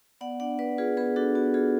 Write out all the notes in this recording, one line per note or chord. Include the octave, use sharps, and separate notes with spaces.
B3 D5 F#5
D4 D5 F#5
B3 B4 D5
F4 G#4 B4
B3 G#4 B4
D4 F#4 A4
B3 F#4
F4 G#4